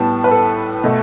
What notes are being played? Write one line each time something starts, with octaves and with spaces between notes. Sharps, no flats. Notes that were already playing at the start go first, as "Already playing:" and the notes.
Already playing: A2 G3 B3 A5
B4
A4
B2 A3